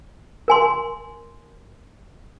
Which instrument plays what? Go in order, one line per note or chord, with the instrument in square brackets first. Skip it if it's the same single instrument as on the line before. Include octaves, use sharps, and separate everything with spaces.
[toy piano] A#4 G#5 C6